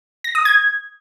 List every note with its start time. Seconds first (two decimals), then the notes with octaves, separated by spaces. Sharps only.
0.24 A#6
0.35 D#6
0.45 G#6